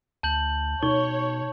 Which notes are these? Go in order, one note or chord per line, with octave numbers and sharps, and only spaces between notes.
D2 A5 G6 F#7
B2 D#4 C#5 C#6